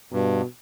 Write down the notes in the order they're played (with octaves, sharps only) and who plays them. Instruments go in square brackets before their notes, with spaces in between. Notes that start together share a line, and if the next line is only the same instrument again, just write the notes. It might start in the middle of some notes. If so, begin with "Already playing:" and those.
[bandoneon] G2 [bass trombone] B2